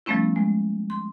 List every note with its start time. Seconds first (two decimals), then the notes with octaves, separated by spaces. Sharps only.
0.06 F3 G3 A3 B3 C#4 E4
0.36 G#3
0.90 C6